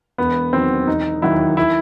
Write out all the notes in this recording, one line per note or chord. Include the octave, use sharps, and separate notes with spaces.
E1 B3
E2 D#3 F#3 C4
E1 D#4
D#2 D#3 F#3 E4
E4